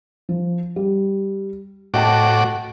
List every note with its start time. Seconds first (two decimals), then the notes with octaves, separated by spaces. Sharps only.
0.29 F3
0.76 G3
1.94 A2 F#4 D#5 G5 A5 D6